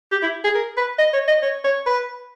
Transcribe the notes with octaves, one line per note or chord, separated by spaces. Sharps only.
G4
E4
G#4
A#4
B4
D#5
C#5
D#5
C#5
C#5
B4